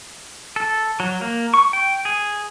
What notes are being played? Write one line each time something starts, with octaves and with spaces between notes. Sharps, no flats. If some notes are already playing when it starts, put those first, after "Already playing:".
A4
F#3
A#3
C#6
G5
G#4